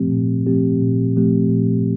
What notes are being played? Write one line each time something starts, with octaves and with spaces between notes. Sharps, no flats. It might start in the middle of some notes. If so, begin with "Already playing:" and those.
Already playing: A#2 F3 A3 C4 G4
A#2
F3 A3 C4 G4
A#2
F3 A3 C4 G4
A#2